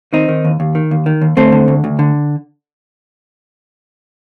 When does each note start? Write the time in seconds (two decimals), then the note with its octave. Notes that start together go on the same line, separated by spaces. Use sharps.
0.13 D#3 C4 D#4
0.28 D#3
0.45 D#2
0.60 D#2
0.75 D#3
0.91 D#2
1.06 D#3
1.22 D#2
1.37 D2 A3 C4
1.52 D3
1.68 D2
1.84 D2
1.99 D3